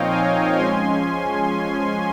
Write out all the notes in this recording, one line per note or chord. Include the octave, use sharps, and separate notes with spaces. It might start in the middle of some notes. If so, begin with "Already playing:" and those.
Already playing: A#2 F3 C4 D#4 C#5 D#5 F5 G5
F5 G#5
F3 G#3 C#4 G#5 C6